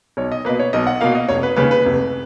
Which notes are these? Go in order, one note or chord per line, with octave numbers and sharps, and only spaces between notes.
B1 C#5
D#5
B2 A#3 B4
C#5
B1 D#5
F#5
B2 A#3 F5
D#5
F1 C#5
B4
D#2 C#3 B4
B4
F1